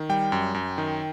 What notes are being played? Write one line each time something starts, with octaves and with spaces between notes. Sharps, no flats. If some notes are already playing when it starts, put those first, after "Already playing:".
Already playing: D#3
G3 G5
F#2
F#2
D#3